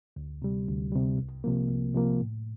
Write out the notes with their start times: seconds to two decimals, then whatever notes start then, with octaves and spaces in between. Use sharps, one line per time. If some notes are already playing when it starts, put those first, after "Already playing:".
0.16 D2
0.42 C3 G3
0.68 D2
0.92 C3 G3
1.18 C2
1.44 C3 F3 A#3
1.69 C2
1.94 C3 F3 A#3
2.21 A2